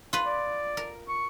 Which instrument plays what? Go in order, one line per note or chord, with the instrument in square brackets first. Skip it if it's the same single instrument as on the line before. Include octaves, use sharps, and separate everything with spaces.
[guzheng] F4 B4
[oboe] D5
[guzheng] A#4
[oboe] C#6